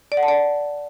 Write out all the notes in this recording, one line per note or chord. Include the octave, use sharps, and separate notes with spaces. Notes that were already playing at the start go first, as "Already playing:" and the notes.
D5
F#5
A5
D5